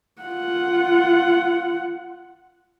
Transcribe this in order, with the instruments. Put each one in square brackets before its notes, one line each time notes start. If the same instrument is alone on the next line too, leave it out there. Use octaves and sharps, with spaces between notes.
[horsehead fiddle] F4 F#5